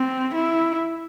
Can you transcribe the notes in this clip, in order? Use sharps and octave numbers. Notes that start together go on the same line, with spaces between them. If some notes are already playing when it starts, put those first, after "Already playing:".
Already playing: C4
E4